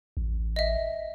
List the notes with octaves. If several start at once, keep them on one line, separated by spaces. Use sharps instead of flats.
A1
D#5 E5